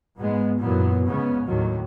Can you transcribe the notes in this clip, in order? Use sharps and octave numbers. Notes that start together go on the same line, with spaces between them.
G#2 G#3 B3
F#2 A#2 E3 F#3 B3
G#2 C#3 B3 C#4
D#2 A2 D#3 F#3